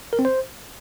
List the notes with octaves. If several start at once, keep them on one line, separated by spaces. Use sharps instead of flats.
A#4
C4
C5